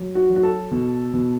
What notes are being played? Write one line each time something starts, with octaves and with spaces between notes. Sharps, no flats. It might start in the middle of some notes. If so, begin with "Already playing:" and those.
Already playing: F#3
F#4
F#3
F#4
A4
B2
B2